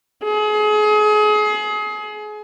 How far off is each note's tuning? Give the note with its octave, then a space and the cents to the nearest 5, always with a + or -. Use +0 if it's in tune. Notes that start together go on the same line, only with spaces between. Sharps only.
G#4 +30